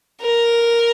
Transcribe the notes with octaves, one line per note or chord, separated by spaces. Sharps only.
A#4